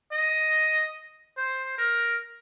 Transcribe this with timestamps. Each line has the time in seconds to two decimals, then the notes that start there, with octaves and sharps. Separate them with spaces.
0.12 D#5
1.37 C5
1.78 A#4